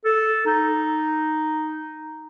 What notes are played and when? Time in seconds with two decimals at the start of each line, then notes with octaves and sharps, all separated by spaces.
0.05 A4
0.46 D#4